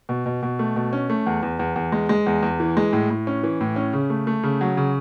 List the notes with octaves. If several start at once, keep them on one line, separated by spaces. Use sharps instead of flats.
B2
B2
B2
A3
B2
C#4
A3
E2
E2
E2
E2
G#3
G#3
E2
E2
E3
G#3
A2
A2
C#4
E3
A2
C#4
C#3
A3
A3
C#3
F#3
C#3